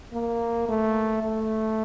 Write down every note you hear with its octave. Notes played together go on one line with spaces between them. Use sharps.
A#3
A3
A3